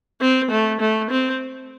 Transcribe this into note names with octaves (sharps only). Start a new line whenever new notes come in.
C4
A3
A3
C4